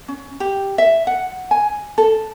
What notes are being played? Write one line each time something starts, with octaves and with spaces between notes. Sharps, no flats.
C#4
G4
E5
F#5
G#5
A4